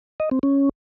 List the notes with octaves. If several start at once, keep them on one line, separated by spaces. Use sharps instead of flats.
D#5
C4
C#4